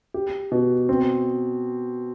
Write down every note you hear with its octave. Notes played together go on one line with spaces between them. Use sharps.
G4
B2
C4